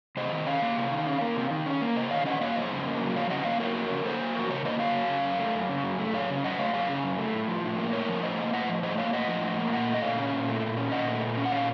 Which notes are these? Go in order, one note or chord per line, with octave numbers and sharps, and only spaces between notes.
C3 C5 D#5
D#3
C#4 C#5 F5
A#3
C3
D#3
C#4
A#3
C3
D#3
C#4
A#3
C3 C5 D#5
D#3 C#5 F5
C#4 D#5 F#5
A#3 C#5 F5
F2 C5 D#5
C#3
A#3
F#3
F2 C#5 F5
C#3 D#5 F#5
A#3 C#5 F5
F#3 A#4 C#5
F2 A#4 C#5
C#3
A#3 A4 C5
F#3
F2 F#4 A#4
C#3 A#4 C#5
A#3 C5 D#5
F#3 C#5 F5
F#2
C#3
F#2
A3
F#2
C#3
F#2
A3
F#2 C#5 F5
C#3
F#2 D#5 F#5
A3 C#5 F5
F#2 C#5 F5
C#3
F#2
A3
A2
F3
A2
A#3
A2 A#4 C#5
F3
A2 C5 D#5
A#3
A2 D#5 F#5
F3
A2 C5 D#5
A#3 C#5 F5
A2 D#5 F#5
F3
A2
A#3
A#2 D#5 F#5
A3
D#5
A#2 C#5 F5
C#4
A#2
A3
A#2
C#4
A#2 D#5 F#5
A3
A#2
C#4
F#5
A#2 C#5 F5